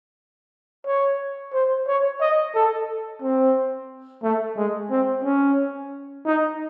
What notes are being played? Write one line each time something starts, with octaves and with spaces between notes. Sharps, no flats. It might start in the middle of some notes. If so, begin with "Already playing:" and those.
C#5
C5
C#5
D#5
A4
C4
A3
G#3
C4
C#4
D#4